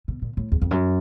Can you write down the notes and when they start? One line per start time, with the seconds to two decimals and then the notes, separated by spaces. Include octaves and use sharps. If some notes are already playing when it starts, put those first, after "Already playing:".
0.08 B2
0.22 A#2
0.37 A2
0.52 E2
0.62 F2
0.71 F#2